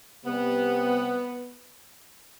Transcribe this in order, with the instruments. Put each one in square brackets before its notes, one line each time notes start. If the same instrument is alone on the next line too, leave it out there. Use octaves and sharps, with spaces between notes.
[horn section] C3 G3 B3